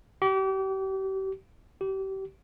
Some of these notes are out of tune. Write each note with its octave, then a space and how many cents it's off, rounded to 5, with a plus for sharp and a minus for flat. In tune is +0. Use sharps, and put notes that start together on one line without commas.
G4 -35
G4 -30